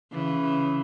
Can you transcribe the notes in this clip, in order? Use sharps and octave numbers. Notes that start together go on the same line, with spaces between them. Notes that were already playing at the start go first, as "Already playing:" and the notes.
C#3 E3